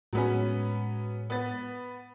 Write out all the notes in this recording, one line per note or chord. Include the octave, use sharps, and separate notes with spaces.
A2 F#3 G#3 B3 C#4
B3 A6